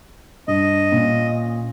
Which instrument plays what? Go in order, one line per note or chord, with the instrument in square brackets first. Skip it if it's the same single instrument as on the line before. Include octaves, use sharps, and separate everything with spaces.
[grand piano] G2 [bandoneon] D#5
[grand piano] A#2 C#4